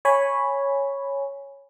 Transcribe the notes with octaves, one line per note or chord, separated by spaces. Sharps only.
C#5 G#5 B5